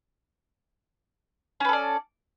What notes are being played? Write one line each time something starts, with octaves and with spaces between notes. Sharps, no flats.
C#4 A4 B4 D5